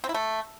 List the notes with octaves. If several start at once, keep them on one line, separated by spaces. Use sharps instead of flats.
C4
E4
A3